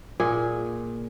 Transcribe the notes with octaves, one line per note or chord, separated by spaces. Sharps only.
A#2 G#4